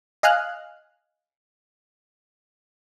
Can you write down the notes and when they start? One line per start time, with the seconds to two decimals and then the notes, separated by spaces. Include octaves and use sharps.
0.23 D#5 F5 G#5 F6 F#6